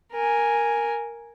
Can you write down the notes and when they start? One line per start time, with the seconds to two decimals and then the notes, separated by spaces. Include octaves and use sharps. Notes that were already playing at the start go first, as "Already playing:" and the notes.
0.13 A#4 G#5